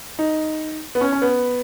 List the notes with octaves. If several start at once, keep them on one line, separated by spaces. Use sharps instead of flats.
D#4
B3
C#4
C#4
B3